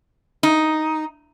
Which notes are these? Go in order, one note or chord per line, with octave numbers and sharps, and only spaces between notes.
D#4